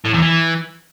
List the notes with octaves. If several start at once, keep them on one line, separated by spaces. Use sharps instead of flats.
A2
E2
E3